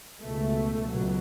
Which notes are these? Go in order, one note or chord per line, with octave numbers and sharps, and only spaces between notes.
C#2 B2 A3
C#2 B2 F#3